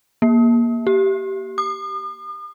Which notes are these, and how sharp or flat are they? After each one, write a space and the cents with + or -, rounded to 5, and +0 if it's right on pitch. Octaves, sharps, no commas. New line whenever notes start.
A#3 +15
G4 -15
D#6 -45